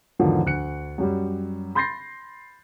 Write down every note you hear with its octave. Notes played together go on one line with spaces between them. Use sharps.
E2 G#2 D3 D#3 F3 F#3
D2 F#6 C#7
F#2 F#3 G3
B5 C6 G6 A6 A#6 C7